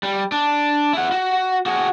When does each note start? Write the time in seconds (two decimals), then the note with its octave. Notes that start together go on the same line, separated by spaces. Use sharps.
0.03 G3
0.32 D4
0.93 E4 F#5
1.12 F#4
1.66 F#4 G#4